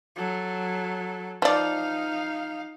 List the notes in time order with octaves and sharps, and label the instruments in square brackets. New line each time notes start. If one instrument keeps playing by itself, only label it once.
[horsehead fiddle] F#3 A4
[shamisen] F3 D5 [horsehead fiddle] D#4 F5